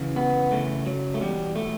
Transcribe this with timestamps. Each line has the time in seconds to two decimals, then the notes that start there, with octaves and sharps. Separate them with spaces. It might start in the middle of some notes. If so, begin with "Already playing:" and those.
Already playing: F#2 C#3 E3
0.16 B3
0.51 F#2 C#3 E3 A3
0.86 F#3
1.14 A3
1.20 E2 B2 G3
1.55 A3